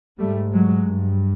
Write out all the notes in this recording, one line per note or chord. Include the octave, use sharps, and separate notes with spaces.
G#2 G3 A3
F#3 G#3
G2